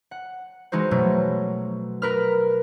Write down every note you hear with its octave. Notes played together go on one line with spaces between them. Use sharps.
F#5
E3 G#3 D#4 F#4 C5
B2 F#3 A3
A#4 B4 F6